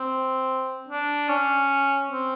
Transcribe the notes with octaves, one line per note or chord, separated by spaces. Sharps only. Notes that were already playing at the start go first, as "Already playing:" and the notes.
Already playing: C4
D4
C#4
C4